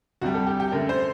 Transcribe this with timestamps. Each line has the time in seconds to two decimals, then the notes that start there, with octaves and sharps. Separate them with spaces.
0.21 D2 C3 G3 F#4
0.34 A4
0.46 G4
0.60 G4
0.72 F#2 D3 A3 A#4
0.89 C5